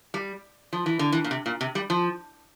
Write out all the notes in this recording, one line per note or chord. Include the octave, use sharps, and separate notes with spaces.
G3
F3
E3
D3
E3
A#2
C3
A#2
C3
G3
F3